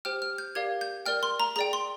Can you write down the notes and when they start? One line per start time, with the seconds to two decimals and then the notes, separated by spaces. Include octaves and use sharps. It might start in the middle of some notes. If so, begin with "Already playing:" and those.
0.05 G4 C5 G5 F6
0.22 F6
0.38 G6
0.55 G4 A#4 D5 F5 G#6
0.81 G6
1.06 A#4 D5 G5 F6
1.23 C6
1.40 A#5
1.56 G#4 D5 G5 A#5
1.73 C6